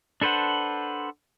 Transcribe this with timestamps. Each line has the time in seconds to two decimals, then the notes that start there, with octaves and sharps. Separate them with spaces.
0.21 D4 A4 B4 C5 F#5